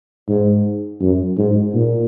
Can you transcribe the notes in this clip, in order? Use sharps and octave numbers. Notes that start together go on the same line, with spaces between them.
G#2
F#2
G#2
A#2